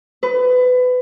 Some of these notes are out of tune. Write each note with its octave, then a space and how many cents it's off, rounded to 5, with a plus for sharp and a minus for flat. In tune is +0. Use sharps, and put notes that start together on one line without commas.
B4 +25